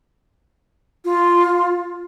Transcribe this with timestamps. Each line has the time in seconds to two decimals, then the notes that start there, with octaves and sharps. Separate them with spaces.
1.05 F4